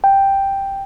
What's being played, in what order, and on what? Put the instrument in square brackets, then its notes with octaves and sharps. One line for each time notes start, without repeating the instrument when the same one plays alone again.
[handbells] G5